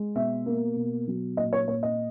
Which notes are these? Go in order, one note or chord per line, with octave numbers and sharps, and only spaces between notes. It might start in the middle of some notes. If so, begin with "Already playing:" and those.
Already playing: G#3
B2 E5
A#3
B2
F#3
A#2 D#5
C#5
A#2 C#5
D#5